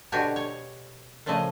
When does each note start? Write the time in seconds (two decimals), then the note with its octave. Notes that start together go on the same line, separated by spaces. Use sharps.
0.12 B2 D3 F#4 G4 C#5 G#5
0.36 C#5
1.26 A#2 C#3 F3 A3 D#5